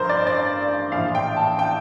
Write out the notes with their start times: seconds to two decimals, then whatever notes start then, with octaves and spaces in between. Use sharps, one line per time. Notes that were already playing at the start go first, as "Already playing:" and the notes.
Already playing: A1 G2 F3 A#4 C5
0.09 D5
0.27 D5
0.92 A#1 F5
0.95 A2 E3
1.15 G5
1.37 A5
1.59 G5